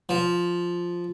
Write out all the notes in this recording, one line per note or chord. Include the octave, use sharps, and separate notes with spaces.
F3